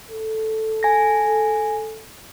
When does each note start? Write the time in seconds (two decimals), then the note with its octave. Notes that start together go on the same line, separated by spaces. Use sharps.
0.11 A4
0.83 G#5 A#6